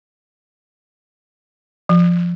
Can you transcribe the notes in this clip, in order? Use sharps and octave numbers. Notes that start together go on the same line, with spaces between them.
F3